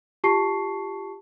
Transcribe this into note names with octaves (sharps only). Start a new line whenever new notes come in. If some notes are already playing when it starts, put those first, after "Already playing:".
F4 G4 A5 C#6 C7